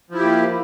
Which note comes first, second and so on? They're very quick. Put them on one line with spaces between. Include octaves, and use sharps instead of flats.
F3 E4 G4 A#3